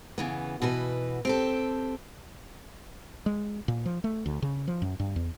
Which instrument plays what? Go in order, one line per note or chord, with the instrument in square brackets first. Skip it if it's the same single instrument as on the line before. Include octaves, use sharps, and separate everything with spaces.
[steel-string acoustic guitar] C#3 E3 B3
B2 E3 F#4 B4
C4 G4 A4
[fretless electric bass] G#3
A#2
F3
A3
D2
C#3
F3
F#2
G2
E2